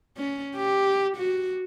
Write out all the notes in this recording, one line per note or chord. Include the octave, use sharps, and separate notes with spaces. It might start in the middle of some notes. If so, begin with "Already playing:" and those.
C#4
G4
F#4